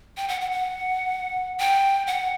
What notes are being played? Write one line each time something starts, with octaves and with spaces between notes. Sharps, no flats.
G5
F#5
F#5
F#5
G5
F#5